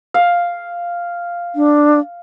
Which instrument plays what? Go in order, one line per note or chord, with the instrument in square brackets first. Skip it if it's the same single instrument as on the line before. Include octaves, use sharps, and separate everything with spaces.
[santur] F5
[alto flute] D4